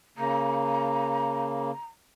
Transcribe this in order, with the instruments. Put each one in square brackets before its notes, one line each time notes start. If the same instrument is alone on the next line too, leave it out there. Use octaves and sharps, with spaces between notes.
[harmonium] C#3 A#3 [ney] A#5